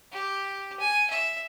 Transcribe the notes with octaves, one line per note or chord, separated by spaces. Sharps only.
G4
G#5
E5